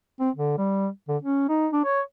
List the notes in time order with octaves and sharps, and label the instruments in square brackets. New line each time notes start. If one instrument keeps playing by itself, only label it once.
[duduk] C4
D3
G3
D3
C#4
D#4
D4
C#5